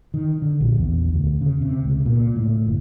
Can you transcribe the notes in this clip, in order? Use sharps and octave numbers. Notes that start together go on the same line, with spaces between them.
D#3
D3
A#1
E2
D2
C#3
C3
C#2
A#2
A2
G1